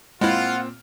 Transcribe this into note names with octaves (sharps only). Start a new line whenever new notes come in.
A#2 G#3 C4 E4 F4 F#5 F6